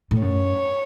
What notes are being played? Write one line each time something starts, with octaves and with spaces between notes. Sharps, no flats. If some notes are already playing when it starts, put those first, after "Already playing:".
A2
F#2 C#5